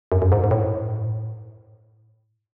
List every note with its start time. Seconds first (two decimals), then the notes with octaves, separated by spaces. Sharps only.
0.12 F#2
0.22 F#2
0.32 G#2
0.44 G#2
0.51 A2